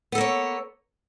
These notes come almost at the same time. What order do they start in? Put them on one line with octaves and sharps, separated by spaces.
B3 A4 A#3 C#5